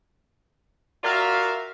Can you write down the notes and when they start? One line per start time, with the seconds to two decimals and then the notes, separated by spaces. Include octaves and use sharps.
1.04 F4 F#4 A#4 D5 E5 F5